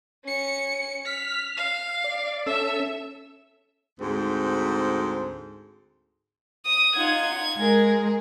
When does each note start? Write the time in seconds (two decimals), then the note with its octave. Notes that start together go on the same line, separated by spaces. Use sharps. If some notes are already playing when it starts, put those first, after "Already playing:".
0.24 C#4 C#7
1.06 F6 B6
1.57 F5
2.04 D5
2.46 C#4 A4 E5 E6
4.00 D2 G#2 C4
6.66 D#6
6.96 D#4 F4 F#5 G#6
7.58 G#3 G#4 A#4